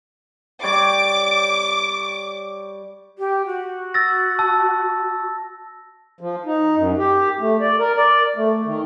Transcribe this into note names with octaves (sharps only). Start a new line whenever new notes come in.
G3 C#5 D5 D6
G4
F#4
E6 A6 A#6
A5 E6
F3
D#4
F#2
G4
A3
D5
A#4
D5
A3
D#3